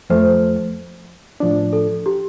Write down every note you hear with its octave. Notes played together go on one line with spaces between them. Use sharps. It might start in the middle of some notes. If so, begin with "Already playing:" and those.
F2 F3 A3 C5
A2 F3 D4
A4
G4